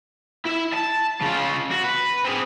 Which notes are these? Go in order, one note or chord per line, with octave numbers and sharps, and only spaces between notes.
E4 E5
A5
C#3 F4
F#4
B4
C4 G#4